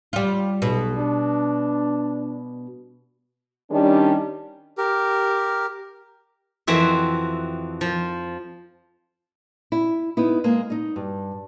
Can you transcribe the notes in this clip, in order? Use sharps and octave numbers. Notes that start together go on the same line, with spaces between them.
G3 F4
B1 B2
D4
D#3 G3 C#4 D4
G4 A#4
F2 E3 C4 F#4 E5
F3
E4
B3 D#4 E4
G#3 A#3
D#4 D#5
G2